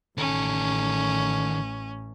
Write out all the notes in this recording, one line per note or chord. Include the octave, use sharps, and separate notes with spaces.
A1 D#3 C#4 A4